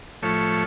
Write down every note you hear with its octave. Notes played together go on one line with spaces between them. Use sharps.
A2 F3 A3 C#5